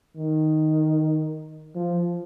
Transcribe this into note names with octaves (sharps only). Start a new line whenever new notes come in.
D#3
F3